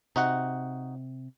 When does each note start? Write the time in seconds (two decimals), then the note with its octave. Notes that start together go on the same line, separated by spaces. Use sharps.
0.16 C3 D#4 F#4 F#5